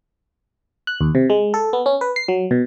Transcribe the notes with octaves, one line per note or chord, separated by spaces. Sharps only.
F#6
D#2
C3
G#3
A4
B3
C#4
B4
C7
F#3
B2